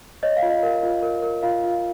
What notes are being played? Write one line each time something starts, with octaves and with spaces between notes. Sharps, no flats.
C#5 D#5
F5
F4
D#5
A#4
F4
A#4
A#4
F4 F5
F4